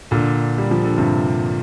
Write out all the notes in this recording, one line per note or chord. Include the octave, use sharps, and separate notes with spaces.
A#2 D3
G3
F3
D3
G2 C3